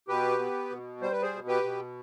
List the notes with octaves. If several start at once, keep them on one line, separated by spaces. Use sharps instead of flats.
B2 G4 B4
B3
B2
G3 C5
B4
G#4 C5
B2
G4 B4
B2